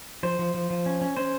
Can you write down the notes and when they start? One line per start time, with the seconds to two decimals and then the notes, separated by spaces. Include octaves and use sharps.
0.23 F3 C5
0.39 F3
0.54 F3
0.70 F3
0.86 C#4
1.01 C#4
1.17 C#4 C5